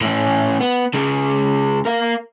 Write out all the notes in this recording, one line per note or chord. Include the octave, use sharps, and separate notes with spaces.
A2 C#4
B3
C#3 G#3
A#4 F5